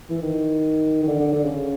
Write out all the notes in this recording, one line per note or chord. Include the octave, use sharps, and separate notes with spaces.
E3
D#3
D#3
D3
D3
D3
C#3